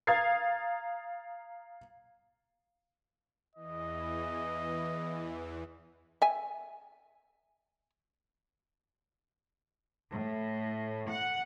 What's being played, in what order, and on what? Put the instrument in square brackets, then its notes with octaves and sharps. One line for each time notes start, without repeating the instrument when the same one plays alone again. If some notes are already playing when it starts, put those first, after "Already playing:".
[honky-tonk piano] F5 A#5 D#6 G#6 A6 C7
[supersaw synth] E2 E3 [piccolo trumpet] D#5
[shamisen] E5 G#5
[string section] A2
F#5